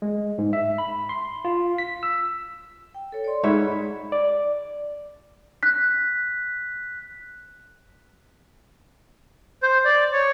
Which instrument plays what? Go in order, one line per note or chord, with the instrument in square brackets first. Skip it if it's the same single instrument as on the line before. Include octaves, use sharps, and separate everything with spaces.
[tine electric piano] G#3
G#2
E5
B5
C6
F4
B6
E6
[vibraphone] G5
A4 C#5
C#5 D5 C6
[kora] G#2 C#5 E5 [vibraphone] B5
[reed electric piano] D5
[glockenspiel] F#6 B6
[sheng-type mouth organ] C5
D5
C#5